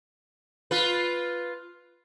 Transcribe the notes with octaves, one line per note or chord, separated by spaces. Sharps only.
F4 B4